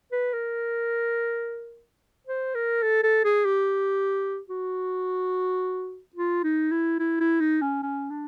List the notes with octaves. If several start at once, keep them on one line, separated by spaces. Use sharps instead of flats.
B4
A#4
C5
A#4
A4
A4
G#4
G4
F#4
F4
D#4
E4
E4
E4
D#4
C#4
C#4
D4